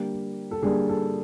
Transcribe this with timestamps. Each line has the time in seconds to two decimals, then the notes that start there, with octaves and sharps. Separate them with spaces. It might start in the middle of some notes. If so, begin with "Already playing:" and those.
Already playing: D3 G3 A#3 G4
0.51 A4
0.62 D3 G3 A#3 G#4
0.89 A4